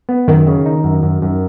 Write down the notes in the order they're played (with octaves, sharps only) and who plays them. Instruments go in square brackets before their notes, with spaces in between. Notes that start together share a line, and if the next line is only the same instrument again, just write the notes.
[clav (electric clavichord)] B3
[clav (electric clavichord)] F#2 [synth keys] D#3
[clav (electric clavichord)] C#3
D#4
F#2
F#2
F#2